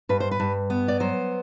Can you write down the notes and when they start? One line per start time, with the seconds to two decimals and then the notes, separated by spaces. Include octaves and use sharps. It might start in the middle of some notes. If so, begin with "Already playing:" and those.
0.09 G2 B4
0.20 C5
0.31 B4
0.40 G2
0.70 B3
0.88 D5
1.00 F#3 C5